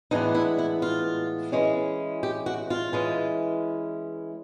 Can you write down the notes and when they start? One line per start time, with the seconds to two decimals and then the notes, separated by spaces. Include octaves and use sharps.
0.11 A2 E3 G#3 B3 D4 D#4
0.35 E4
0.58 E4
0.82 F4
1.52 E3 G#3 C#4
2.23 G4
2.46 F#4
2.70 F4
2.93 E3 G#3 C#4